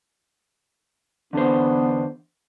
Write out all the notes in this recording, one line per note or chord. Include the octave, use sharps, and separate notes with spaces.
E2 D3 B3 D4 C5